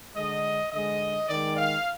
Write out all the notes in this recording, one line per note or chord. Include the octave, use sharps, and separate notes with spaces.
D3 G#3 D#5
D3 G#3 D#5
D#3 G#3 D5
F5